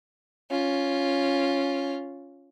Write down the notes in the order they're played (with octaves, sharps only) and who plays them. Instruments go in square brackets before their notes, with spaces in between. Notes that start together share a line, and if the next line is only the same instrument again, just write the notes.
[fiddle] C#4 F4